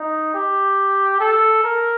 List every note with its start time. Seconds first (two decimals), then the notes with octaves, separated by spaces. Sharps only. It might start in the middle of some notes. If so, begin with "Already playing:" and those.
Already playing: D#4
0.34 G4
1.20 A4
1.64 A#4